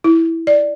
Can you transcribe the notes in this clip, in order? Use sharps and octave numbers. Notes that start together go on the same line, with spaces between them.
E4
D5